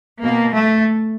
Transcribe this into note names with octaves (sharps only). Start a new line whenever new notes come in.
B2 A#3
A3